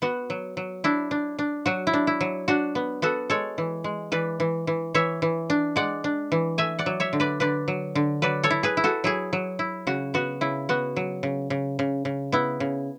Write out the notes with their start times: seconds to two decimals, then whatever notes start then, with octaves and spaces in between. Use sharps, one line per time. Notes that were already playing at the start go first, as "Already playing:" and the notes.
0.02 B3 F#4
0.30 F#3
0.57 F#3
0.84 D4 E4
1.11 D4
1.39 D4
1.66 F#3 F#4
1.87 E4
1.93 D4
2.07 E4
2.21 F#3
2.48 D4 F#4
2.75 B3
3.02 B3 F#4 A4
3.30 G#3 A4 C#5
3.58 E3
3.84 G#3
4.12 E3 B4 D5
4.40 E3
4.67 E3
4.94 E3 C#5 E5
5.22 E3
5.50 D4
5.76 G#3 D5 F#5
6.04 D4
6.32 E3
6.58 A3 E5 G#5
6.79 D5 F#5
6.86 F#3
7.00 C#5 E5
7.13 D3
7.20 B4 D5
7.40 D3 B4 D5
7.68 F#3
7.95 D3
8.22 F#3 B4 D5
8.43 A4 C#5
8.50 E4
8.63 G#4 B4
8.77 E4
8.84 F#4 A4
9.04 F#3 E4 G#4
9.33 F#3
9.59 E4
9.87 C#3 F#4
10.14 B3 F#4
10.41 C#3 E4
10.69 B3 F#4
10.96 F#3
11.23 C#3
11.50 C#3
11.79 C#3
12.05 C#3
12.32 B3 E4
12.60 C#3